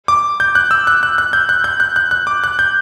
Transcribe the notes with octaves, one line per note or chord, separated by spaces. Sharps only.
D6
G6
F#6
E6
F#6
F#6
F#6
G6
F#6
G6
F#6
F#6
F#6
D6
F#6
G6